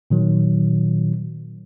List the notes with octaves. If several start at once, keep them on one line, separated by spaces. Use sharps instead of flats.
A#2 D#3 F#3